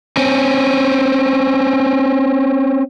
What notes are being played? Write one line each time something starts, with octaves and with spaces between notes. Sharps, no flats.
C4 C#4